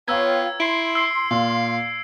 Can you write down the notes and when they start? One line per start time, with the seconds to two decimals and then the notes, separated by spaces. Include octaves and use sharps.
0.08 B3 F4 C#5 G5 A#5 C#6 E6 G#6
0.60 E4 C6 C7 D7
0.95 E6 C7
1.31 A#2 F5